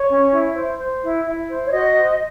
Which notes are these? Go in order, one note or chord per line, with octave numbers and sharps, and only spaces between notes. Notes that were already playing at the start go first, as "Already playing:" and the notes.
Already playing: C#5
C#4
E4
C5
C5
E4
E4
C5
C#5
F#4 D#5
C5